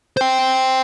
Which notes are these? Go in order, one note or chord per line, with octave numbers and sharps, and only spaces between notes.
C5 G5